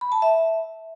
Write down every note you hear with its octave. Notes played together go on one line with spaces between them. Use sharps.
B5
A5
E5